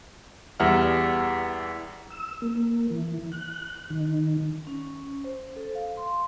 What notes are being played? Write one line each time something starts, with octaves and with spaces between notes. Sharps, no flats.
E2 E3 G3 E5 F#5 F6
E6
A#3
E3
F#6
D#3
C#4
C5
A4
F5
C6